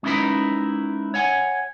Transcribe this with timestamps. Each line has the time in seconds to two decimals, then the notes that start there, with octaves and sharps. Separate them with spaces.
0.03 G#3 C#4 D#4 E4 A#4 B4
1.14 C#5 F#5 G#5